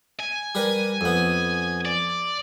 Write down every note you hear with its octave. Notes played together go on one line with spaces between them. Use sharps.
G#5
G3 A#4 B4
F2 B3
D5